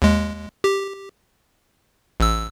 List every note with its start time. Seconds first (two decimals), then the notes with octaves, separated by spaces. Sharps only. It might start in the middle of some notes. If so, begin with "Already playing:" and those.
0.02 D#2 G#3
0.64 G4
2.20 A1 E6